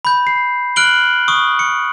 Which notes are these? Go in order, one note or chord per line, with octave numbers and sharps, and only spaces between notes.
B5 G6
C7
F6 F#6 D7 F#7 G7
C#6 D#6
C#7